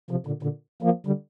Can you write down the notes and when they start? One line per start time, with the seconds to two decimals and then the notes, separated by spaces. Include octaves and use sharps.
0.11 C3 F3
0.27 A#2 D3
0.43 A#2 D3
0.83 F3 A#3
1.07 D3 G3